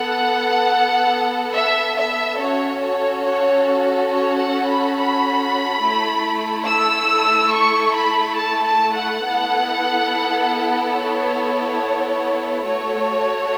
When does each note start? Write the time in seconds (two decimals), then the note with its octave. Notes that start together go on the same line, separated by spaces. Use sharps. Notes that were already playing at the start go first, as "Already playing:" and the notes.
Already playing: B3 A4 F#5
1.55 E5
1.97 E5
2.40 C#4 F#4 A4 C#5
2.83 C#5
3.26 C#5
4.12 C#5
4.40 F#5
4.68 B5
4.97 B5
5.82 A3 E4 A4
6.67 E6
7.53 C#6
7.96 B5
8.38 A5
8.67 A5
8.96 F#5
9.24 B3 E4 A4
10.95 C#5
12.66 A3 F#4 A4 C#5